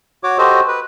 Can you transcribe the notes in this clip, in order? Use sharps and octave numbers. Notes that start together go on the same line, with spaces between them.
F#4 C#5 D6
F#4 G4 A4 C5 D#5
B4